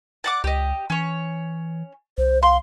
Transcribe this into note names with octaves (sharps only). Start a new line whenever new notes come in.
D5 F#5 D6
C#2 G4 D#5
E3 C#4 C#5
C2 C5
F5 C6